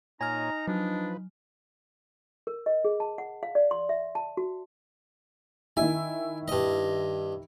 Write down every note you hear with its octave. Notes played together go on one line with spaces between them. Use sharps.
A#2 D#4 C#5 D#5 G#5 A#5 F6
F3 F#3 D4 B4
A#4
D#5
G#4
A5
F#5
F5
D5
C6
E5
A5
F#4
D#3 E4 G#5
G2 D#5